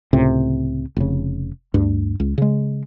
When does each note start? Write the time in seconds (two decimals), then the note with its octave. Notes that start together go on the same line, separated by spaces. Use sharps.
0.13 C#2 A2 C3
0.97 F1 C#3
1.74 D2 G2
2.20 C#2
2.38 C#3 G#3